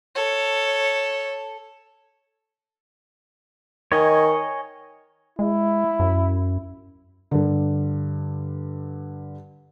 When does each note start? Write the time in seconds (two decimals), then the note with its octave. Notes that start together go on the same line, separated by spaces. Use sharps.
0.15 A4 C#5
3.92 D#3 C#5 D#5 G#5
5.39 G#3 E4
6.00 F#2
7.31 G2 D3